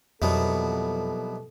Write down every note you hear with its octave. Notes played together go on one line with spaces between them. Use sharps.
C2 F2 B2 F3 F#3 B3 A4